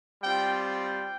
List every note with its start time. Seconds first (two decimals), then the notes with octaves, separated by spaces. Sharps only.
0.22 G3 C4 F4 G5
0.65 G5